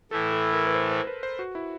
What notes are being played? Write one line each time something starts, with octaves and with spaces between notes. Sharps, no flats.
A2 E3 A3 A4
A4
A#4
B4
C5
C5
B4
C5
F#4
E4